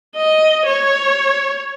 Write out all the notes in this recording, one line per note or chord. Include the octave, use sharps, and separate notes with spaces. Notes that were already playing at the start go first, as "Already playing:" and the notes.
D#5
C#5